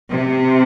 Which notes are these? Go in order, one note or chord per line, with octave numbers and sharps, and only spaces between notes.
C3